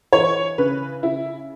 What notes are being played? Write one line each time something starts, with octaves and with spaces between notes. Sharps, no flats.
E3 C#5
C#3 B4
C#3 E4